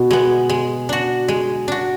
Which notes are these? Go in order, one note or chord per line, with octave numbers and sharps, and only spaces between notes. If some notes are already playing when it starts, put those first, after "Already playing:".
Already playing: B2
G#3 B3
G#3
D4 F#4
G#3
D4 F#4